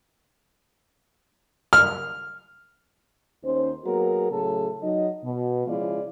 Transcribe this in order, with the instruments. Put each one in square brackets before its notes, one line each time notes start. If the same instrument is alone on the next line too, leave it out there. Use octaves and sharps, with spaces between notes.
[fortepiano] F6
[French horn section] D#2 C#4 D#4 C5
F#3 A#3 B3 F#4 G#4 A#4
A2 C#3 F#3 G#4 A4
F#3 D#4 D#5
B2
C#3 F3 G#3 E4 F4 D5